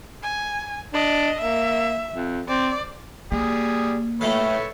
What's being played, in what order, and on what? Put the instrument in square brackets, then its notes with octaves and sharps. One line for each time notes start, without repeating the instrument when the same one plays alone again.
[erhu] G#5
[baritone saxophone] D4 [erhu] D#5
[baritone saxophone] A#3 [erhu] E5
[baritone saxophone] F2
[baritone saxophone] C4 [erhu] D5
[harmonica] G3 G#4 [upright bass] A#3
[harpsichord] A2 A3 F5 [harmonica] A4 B4 C#5